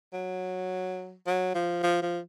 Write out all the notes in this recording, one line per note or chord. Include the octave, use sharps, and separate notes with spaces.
F#3
F#3
F3
F3
F3